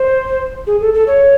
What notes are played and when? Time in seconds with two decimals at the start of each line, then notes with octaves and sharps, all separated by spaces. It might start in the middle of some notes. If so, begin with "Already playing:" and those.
Already playing: C5
0.67 G#4
0.81 A4
0.94 A4
1.07 C#5